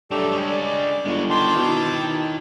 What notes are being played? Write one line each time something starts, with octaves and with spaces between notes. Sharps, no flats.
G2 F#3 A3 G4 A4 D5
G#3 C#4
D5 D6
G1 G#3 F#4
D#3 C#5 G5 A5 C6 D6
B2 E4